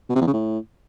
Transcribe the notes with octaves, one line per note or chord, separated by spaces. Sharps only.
B2
C3
E2
C#3
A2